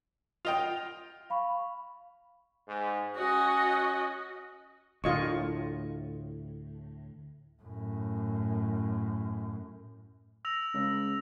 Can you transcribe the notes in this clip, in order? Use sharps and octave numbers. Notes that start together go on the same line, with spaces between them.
F4 D#5 G5 F7
F5 B5 C#6
G#2
C#4 F#4 D#5
D2 A2 F4 D#5 C#6
F#2 A2
E6 A#6 F7
C#2